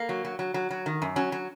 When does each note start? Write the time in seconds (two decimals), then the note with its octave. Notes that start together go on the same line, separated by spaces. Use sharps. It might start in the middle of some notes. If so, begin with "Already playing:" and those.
Already playing: A#3
0.09 F#3
0.25 F#3
0.39 F#3
0.54 F#3
0.70 F#3
0.86 D#3
1.02 F#2
1.16 F#3 C#4
1.32 F#3